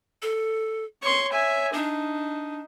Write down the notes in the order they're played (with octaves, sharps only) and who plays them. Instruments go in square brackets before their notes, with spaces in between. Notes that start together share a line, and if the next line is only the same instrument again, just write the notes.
[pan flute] A4
[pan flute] C#5 [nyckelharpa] C6 C#6
[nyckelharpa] E5 G#5
[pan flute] D4 [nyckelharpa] D#4